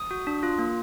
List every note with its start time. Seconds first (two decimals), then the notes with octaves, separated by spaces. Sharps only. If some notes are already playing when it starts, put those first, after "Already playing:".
Already playing: D#6
0.11 F#4
0.27 D4
0.43 F4
0.59 A#3